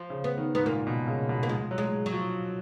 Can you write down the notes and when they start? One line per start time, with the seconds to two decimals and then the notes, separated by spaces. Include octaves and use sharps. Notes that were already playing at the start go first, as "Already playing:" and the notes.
Already playing: F3
0.10 C#3
0.24 B3
0.38 D#3
0.55 G#2 B3
0.66 A#2 A#3
0.87 B2
1.08 C#3
1.29 B2
1.43 A#3
1.49 F3 G#3
1.71 F#3
1.78 G#3
2.06 F#3
2.13 F3